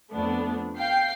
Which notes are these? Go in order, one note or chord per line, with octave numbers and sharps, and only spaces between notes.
F2 A3 B3 D4
F5 G5 C7